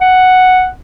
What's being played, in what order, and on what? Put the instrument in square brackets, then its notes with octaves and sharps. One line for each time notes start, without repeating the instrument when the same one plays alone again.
[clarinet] F#5